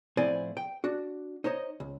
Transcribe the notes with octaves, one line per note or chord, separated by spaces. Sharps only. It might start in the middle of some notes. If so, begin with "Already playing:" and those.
A2 F3 C4 E4 D5 G#5
G5
D4 F#4
D#4 C5 C#5 D#5
C#2